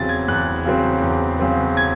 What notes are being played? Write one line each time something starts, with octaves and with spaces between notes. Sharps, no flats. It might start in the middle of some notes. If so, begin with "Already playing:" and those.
Already playing: E2 C#3 F#3 C4 A6
G#6
E2 F#6
C#3 F#3 C4
E2
C#3 F#3 C4
G#6